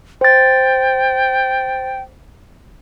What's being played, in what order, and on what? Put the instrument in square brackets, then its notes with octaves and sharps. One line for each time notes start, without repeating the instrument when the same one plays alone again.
[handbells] C5 A6 [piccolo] G5